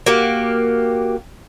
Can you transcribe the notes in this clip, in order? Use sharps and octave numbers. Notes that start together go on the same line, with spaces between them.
A#3 F#4 G4